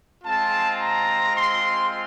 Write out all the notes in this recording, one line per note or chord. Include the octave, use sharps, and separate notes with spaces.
G#3 C4 F4 A5
A#5
C6